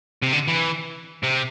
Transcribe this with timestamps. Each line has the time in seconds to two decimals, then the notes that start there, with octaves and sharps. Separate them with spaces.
0.23 C3
0.33 D3
0.48 E3
1.24 C3